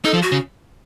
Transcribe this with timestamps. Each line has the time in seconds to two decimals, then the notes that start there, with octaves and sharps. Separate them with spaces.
0.04 D#4 A4
0.13 F3
0.22 F#4
0.32 C#3